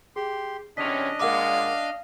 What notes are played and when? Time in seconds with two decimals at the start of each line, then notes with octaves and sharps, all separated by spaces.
0.16 G4 G#4 C6
0.77 E2 C3 C#4 D4 D#5 B6 F7
1.20 A#2 G#3 A#4 F5 F#5 D6